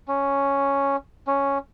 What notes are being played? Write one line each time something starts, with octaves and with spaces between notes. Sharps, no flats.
C#4
C#4